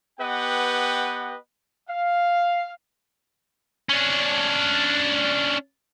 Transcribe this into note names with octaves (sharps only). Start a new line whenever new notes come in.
B3 G4 B4 D#5 F#5 G5
F5
C#4 D4